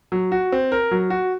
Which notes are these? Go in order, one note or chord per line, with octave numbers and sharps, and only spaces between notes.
F#3
F#4
C4
A#4
F#3
F#4